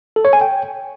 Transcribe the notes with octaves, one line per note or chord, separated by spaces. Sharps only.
A4
C#5
G#5
G5